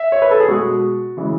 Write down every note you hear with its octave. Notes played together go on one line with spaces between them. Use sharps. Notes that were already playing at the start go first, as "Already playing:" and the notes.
Already playing: E5
C#5
B4
A4
G#4
B2 G#3 F#4
C#3 E3 G#3